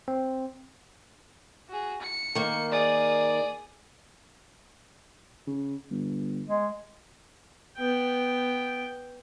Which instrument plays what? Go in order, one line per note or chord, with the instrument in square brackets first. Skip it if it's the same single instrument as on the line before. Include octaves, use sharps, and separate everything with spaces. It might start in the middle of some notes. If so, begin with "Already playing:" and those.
[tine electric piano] C4
[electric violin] F#4 G#4
C#7
[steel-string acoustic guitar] D#3 A#3
[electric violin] G#4 D#6 [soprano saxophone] D5
[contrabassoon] C#3
G1
[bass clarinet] G#3
[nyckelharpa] B3 G5